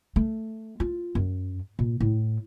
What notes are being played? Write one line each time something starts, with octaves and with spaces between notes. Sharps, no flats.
A3
F4
F#2
A#2
A2